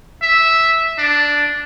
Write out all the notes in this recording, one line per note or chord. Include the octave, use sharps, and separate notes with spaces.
E5
D4